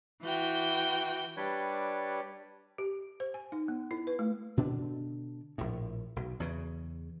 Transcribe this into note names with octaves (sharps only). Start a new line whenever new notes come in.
E3 F#4 G5 G6
G3 D4 B4 C#5
G4
C5
G#5
D#4
B3
E4
B4
A3
B2 D3 D4
A#1 A2
B1
E2 C#3